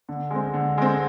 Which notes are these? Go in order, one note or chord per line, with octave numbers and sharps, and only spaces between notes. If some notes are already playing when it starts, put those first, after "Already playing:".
D3
G#3 C4
D3
G#3 C4